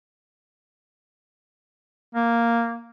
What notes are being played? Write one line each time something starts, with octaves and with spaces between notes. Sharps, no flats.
A#3